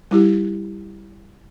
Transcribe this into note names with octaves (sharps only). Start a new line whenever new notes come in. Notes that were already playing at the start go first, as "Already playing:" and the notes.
G3 E4 G4